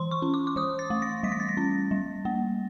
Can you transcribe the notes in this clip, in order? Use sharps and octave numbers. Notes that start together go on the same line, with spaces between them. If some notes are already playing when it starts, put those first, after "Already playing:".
Already playing: E3 C6
C#6
C#4
D6
D6
E3 D#6
A6
A3
A#6
G3 B6
A#6
A6
A#6
C#4
G3
A#3